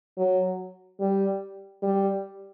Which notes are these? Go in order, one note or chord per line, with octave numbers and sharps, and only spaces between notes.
F#3
G3
G3